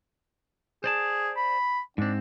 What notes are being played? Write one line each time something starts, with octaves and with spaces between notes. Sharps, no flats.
G#4 C5 D5 A5
B5
G#2 C4 D4